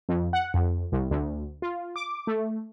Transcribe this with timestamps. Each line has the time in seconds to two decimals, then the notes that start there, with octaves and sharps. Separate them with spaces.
0.09 F2
0.33 F#5
0.54 F2
0.92 C2
1.11 D2
1.62 F4
1.96 D6
2.27 A3